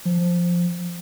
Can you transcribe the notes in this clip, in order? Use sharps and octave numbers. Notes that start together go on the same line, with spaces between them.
F3